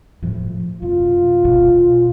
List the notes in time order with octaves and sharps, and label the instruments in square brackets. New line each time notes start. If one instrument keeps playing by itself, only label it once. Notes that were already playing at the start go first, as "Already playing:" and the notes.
[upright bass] A2 F3
[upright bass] F#2 C3 [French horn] F4
[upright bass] D#2 B2